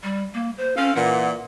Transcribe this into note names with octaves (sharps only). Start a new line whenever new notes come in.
G3
A#3
C5
C4 C#4 A4 F5
A#2 E3 F#5